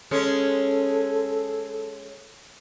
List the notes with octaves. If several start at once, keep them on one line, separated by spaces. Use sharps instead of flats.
G#3 C#4 A4